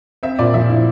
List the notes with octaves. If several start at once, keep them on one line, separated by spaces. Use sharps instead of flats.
C4 E5
A#2 D5
F3 E5
E4